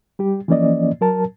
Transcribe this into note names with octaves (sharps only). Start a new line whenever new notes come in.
G3 G4
E3 F3 A#3 C#4 D5 D#5
F#3 A#4 A5